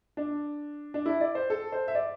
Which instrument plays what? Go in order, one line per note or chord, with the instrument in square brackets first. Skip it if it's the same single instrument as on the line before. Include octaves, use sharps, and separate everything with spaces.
[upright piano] D4
D4
E4
D5
C5
A4
C5
E5
D5